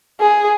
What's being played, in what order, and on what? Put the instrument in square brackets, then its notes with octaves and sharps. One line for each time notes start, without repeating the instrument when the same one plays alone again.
[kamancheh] G#4